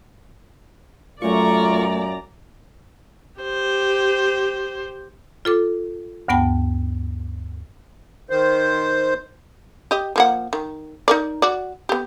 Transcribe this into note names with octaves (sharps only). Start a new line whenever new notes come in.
F#2 A#2 F#3 A3 F4 D5 A#5 C#6
G4 C5
F4 A4 D6
D2 G2 B3 G5 A5
D#3 C5
G4 D#5
F3 A#3 F#5
D#3
D#4 A#4 D5
F#4 D5
B3 G4